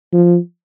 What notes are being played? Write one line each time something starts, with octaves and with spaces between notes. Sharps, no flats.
F3